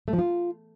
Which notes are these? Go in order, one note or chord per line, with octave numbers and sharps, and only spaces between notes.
A3
F3
F4